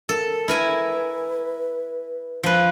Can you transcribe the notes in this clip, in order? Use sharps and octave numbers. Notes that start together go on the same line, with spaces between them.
A4 A#4
E4 A#4 B4 G#5
F3 B4